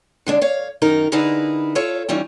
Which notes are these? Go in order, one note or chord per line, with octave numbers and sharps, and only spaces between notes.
D3 G#3 D4
C#5 F5
F#2 D#3 D#4 A#4
D3 D#4 E4 G#4 A#4 B4
F4 A4 C#5 E5
D#3 E3 G3 C#4 F4